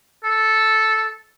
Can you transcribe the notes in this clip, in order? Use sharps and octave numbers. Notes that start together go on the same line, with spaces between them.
A4